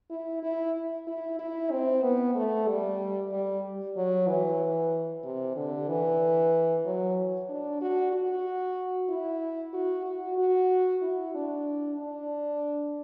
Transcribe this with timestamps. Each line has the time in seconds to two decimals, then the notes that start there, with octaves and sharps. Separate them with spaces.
0.10 E4
0.43 E4
1.07 E4
1.39 E4
1.71 C4
2.02 B3
2.35 A3
2.67 G3
3.32 G3
3.96 F#3
4.28 E3
5.24 C3
5.56 D3
5.89 E3
6.85 F#3
7.49 D4
7.81 F#4
8.13 F#4
9.09 E4
9.74 F#4
10.06 F#4
10.38 F#4
11.02 E4
11.35 D4
11.98 D4